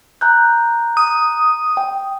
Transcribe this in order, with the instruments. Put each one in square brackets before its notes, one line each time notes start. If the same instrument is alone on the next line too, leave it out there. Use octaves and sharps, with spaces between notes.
[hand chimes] A#5 F#6 G6
[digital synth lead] D#6
[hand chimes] G5